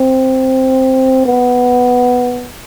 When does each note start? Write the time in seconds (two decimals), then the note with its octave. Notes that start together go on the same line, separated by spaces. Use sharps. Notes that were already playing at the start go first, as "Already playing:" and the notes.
Already playing: C4
1.26 B3